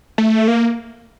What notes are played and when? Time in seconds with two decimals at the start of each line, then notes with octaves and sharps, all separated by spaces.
0.18 A3
0.48 A#3